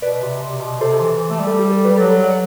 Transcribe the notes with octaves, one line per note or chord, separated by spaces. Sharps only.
B2 B4 D5
C3
C3
B2
C3 A4 C5
E3
A3
G3
A4
G4
A4
G4 B4
G3
F#3 A4
A4
D5 F#5